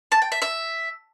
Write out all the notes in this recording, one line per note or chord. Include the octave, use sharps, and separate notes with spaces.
A5
G5
E5
E5